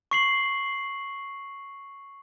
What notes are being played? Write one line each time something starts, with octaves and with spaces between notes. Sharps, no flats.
C#6 C7 F#7